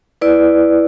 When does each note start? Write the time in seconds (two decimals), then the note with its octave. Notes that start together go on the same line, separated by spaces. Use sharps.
0.21 E4 B4 D5